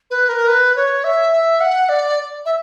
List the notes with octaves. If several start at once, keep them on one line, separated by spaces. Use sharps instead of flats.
B4
A#4
B4
C#5
E5
E5
F#5
D5
E5